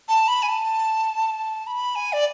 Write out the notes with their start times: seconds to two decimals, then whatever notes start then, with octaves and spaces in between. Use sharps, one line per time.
0.08 A5
0.28 B5
0.42 G#5
0.49 A5
1.67 B5
1.95 G#5
2.13 D5